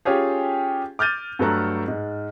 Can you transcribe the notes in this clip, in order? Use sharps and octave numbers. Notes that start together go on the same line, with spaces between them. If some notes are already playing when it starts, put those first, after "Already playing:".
C#4 F4 G4 G#4
D6 F6 G6 A6 D#7
G2 F#3 A3 A4 A#5 F#6
G#2